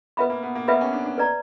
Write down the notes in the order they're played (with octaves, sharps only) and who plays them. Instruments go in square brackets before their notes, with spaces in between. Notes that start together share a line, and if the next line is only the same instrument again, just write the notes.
[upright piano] B3 [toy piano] B4 E5 B5
[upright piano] A#3
B3
A#3
[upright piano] B3 [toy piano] B4 E5 B5
[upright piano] C#4
D4
D4
[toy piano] B4 D5 A#5